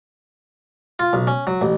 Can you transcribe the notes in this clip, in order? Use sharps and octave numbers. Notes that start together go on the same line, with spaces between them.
F4
B1
C#4
F#3
A1